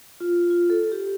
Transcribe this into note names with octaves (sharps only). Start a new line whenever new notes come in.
F4
F4
A4
G4